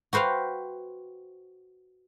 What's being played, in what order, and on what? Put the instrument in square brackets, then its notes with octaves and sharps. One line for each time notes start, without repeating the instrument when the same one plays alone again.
[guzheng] F#4 B4 C5 F5 G5